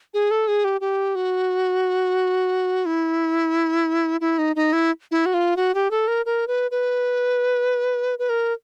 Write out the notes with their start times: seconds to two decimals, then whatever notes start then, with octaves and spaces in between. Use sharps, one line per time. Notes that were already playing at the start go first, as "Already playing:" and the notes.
0.14 G#4
0.31 A4
0.48 G#4
0.64 G4
0.81 G4
1.15 F#4
2.86 E4
4.21 E4
4.38 D#4
4.56 D#4
4.73 E4
5.11 E4
5.26 F#4
5.34 F4
5.57 F#4
5.75 G4
5.91 A4
6.08 A#4
6.26 A#4
6.48 B4
6.71 B4
8.19 B4
8.29 A#4